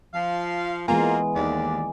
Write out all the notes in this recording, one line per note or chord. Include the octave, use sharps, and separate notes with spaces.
F3 F5
E3 G#3 A#3 B3 F4 G#5
D#2 D5